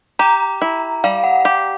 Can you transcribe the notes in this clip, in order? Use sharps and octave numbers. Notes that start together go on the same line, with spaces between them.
G4 A#5
E4
G3 F5
F#5
G4